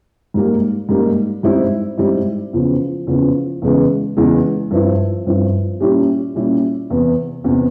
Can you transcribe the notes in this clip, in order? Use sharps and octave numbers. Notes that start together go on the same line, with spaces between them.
G#2 G3 A#3
G#2 G3 A#3
G#2 G3 C4 E4
G#2 G3 C4 E4
E2 C#3 F3
E2 C#3 F3
E2 C#3 E3 G#3
E2 C#3 E3 G#3
G2 F3 C4 E4
G2 F3 C4 E4
A#2 G3 C#4 E4 G4
A#2 G3 C#4 E4 G4
E2 C3 E3
E2 C3 E3